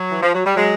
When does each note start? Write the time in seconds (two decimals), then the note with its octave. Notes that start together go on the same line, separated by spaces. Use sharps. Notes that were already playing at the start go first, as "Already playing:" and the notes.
Already playing: F#3
0.12 E3
0.22 F3
0.34 F#3
0.45 G3
0.56 F#3 G#3